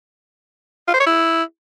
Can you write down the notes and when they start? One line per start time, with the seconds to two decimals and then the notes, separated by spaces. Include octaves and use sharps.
0.88 F4
0.94 C5
1.00 C#5
1.07 E4